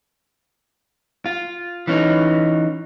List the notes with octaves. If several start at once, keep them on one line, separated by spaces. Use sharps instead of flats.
F4
E3 C#4 D#4